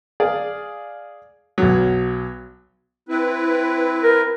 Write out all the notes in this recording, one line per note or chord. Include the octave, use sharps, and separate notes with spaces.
G#4 D5 F5
B1 F#3
C4 E4 B4
A#4